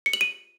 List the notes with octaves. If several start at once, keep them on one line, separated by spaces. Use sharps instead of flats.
C#7
F#7
D#7